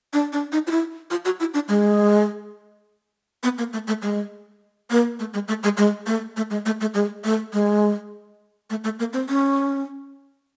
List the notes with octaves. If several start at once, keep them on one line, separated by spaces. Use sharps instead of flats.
D4
D4
D#4
F4
E4
F4
F#4
E4
D4
G#3
B3
A#3
A3
A3
G#3
A#3
A3
G#3
A3
G#3
G#3
A3
A3
G#3
A3
A3
G#3
A3
G#3
A3
A3
A#3
C4
C#4